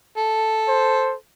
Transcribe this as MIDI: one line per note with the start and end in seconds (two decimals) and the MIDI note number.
0.17 1.14 69
0.69 1.15 72